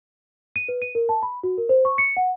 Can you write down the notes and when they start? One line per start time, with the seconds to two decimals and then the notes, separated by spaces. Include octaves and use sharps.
0.56 D#7
0.68 B4
0.82 D#7
0.95 A#4
1.09 A5
1.23 B5
1.43 F#4
1.58 A#4
1.69 C5
1.85 C#6
1.98 C#7
2.17 F#5